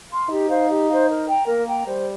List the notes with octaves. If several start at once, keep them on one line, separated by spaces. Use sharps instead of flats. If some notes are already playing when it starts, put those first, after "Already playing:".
F5 C6
D#4 G4
C5 F5
G4
C5 F5
A#4
G5 A#5
A#3 A#4
G5 A#5
G3 C5